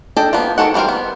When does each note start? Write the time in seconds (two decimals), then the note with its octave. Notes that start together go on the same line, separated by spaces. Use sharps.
0.17 D4 A4 D#5 G5
0.33 F3 A#3 B3
0.58 D#3 F3 F#4 A4 F#5
0.74 E3 G3 C4 A#4 C5
0.88 B3